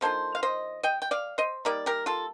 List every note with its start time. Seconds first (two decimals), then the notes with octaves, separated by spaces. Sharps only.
0.01 D#3 A#3 D4 F4 A4 C5
0.35 F5
0.43 C5 D#5
0.83 D#5 G5
1.02 G5
1.11 D5 F5
1.38 C5 D#5
1.65 G3 A#3 D#4 A#4 D5
1.86 G4 A#4
2.06 F4 A4